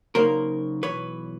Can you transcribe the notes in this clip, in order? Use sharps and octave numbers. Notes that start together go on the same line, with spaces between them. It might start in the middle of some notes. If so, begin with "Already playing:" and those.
C#3 F#3 A#3 D#4 A#4 C5
B1 A2 E3 B4 C#5